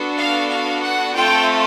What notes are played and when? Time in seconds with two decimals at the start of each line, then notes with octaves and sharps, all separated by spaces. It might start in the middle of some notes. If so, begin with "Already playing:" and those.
Already playing: B3 D4 F#4 A4
0.17 F5
0.50 F5
0.82 F#5
1.15 A3 C4 F4 A4 G5